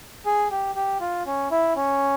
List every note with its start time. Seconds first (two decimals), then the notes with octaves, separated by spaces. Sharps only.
0.26 G#4
0.51 G4
0.75 G4
1.00 F4
1.26 C#4
1.51 E4
1.76 C#4